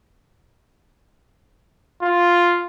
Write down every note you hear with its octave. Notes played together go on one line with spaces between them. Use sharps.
F4